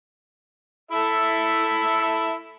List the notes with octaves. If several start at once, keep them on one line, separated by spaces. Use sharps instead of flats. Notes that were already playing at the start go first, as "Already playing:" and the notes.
E4 A4 E5